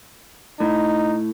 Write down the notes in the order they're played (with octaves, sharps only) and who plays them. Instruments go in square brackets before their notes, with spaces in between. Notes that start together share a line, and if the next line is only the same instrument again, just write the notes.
[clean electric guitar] A2 [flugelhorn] D#4